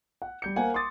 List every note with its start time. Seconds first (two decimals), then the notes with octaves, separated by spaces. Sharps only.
0.22 F#5
0.42 G3 G6 C#7
0.56 A#3 C5 F5 F#5 G#5
0.74 C6 D6 D#6 A6